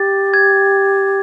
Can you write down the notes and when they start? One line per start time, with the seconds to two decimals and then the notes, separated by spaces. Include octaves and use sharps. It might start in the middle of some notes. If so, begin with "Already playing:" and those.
Already playing: G4 A6
0.34 G#6